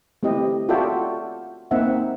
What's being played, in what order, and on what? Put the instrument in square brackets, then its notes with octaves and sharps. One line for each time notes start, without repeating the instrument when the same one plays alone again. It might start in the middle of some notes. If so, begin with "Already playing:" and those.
[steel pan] A3 C4 E4 G4 D#5
F4 F#4 A4 D5 E5 G5
A#3 C4 D#4 E5 F#5